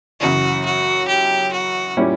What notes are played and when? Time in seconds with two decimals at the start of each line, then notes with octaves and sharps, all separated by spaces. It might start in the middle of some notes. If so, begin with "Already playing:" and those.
0.20 F#2 C#3 E3 F#4
0.65 F#4
1.08 G4
1.53 F#4
1.97 A#2 G3 C#4 E4 G4